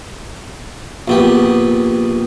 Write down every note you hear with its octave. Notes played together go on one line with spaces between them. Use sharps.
A#1 B3 G4